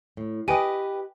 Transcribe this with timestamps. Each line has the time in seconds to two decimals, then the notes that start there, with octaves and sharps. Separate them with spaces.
0.17 A2
0.48 G4 B4 D#5 G5 G#5 D#7